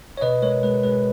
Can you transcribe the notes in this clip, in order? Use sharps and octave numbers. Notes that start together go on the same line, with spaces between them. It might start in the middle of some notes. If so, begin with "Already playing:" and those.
C#5
B2 B4 D#5
G#3 A#4 C#5
G#3 B4
G#3 B4